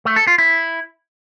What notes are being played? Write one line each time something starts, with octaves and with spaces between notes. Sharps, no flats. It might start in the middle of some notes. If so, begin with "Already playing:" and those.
A3
A4
F4
E4